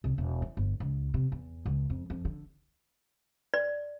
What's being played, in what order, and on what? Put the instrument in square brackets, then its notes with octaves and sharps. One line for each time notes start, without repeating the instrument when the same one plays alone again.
[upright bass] C2
E1
E3
G1
C#2
C3
E2
C#2
F2
F2
D3
[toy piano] D5